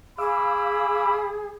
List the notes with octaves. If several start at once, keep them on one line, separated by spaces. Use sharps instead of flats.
G#4 F5 B5 D6 E6